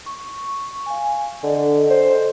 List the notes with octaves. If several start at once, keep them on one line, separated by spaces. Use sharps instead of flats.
C#6
F5 G#5
D3 A4 D#5
C5